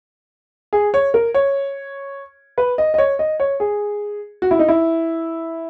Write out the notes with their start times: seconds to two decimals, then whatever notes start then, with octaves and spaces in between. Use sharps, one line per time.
0.73 G#4
0.94 C#5
1.14 A#4
1.34 C#5
2.58 B4
2.78 D#5
2.94 D#5
2.98 C#5
3.19 D#5
3.40 C#5
3.60 G#4
4.42 F#4
4.51 E4
4.59 D#4
4.68 E4